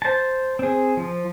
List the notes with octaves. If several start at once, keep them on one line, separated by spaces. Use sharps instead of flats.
C5 A5
C4 G#4
F3